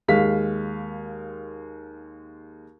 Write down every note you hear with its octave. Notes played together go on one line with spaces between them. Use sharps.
D#2 G#3 F5 B6